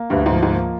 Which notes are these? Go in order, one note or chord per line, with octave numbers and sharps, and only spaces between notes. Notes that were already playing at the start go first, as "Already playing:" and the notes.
Already playing: A#3
D2 G2
G#2
F3
G#2
A#3